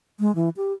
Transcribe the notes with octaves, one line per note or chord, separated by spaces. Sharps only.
G#3
E3
G4